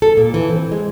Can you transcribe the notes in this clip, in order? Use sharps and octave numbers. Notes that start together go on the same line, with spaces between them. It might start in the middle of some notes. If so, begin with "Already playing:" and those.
A4
A#2
E3
C4
G#3